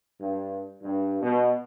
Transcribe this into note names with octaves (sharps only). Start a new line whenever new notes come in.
G2
G2
B2